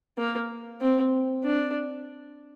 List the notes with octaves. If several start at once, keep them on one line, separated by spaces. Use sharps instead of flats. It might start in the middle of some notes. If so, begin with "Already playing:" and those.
A#3
C4
D4